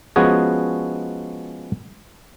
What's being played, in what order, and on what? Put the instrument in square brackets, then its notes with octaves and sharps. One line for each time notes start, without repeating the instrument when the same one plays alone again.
[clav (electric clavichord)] F3 G#3 B3 C#4 F#4 G#4